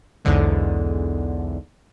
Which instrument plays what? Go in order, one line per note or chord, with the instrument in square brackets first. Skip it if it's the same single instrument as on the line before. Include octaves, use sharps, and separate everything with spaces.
[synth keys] B1 E2 G#2 D3 G#3